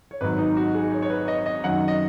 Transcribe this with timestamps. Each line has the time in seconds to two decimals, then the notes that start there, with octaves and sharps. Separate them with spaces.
0.11 C#5
0.21 G#1 G#2 F#3 B4
0.38 D#4
0.57 F#4
0.75 G#4
0.92 C#5
1.02 C#5
1.10 B4
1.28 D#5
1.46 D#5
1.64 F#2 D#3 F#3 F#5
1.88 D#5